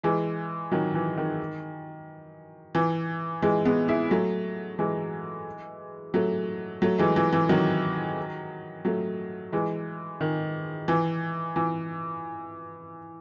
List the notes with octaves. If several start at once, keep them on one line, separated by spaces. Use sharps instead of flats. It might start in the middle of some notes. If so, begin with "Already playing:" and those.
E3 G#3
D#3 F#3
E3
D#3
E3
E3 G#3
G#3 B3
E4 G#4
F#3 A3
E3 G#3
F#3 A3
F#3 A3
E3 G#3
E3
E3
D#3 F#3
F#3 A3
E3 G#3
D#3
E3
E3